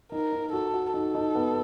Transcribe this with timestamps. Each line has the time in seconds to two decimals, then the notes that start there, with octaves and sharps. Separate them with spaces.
0.12 D#4 A#4
0.32 D#4
0.53 F#4 A4
0.74 F#4
0.93 D#4 A4
1.15 D#4
1.35 B3